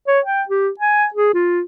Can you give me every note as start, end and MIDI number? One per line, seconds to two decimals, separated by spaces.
0.08 0.20 73
0.25 0.42 79
0.49 0.69 67
0.80 1.06 80
1.14 1.34 68
1.34 1.61 65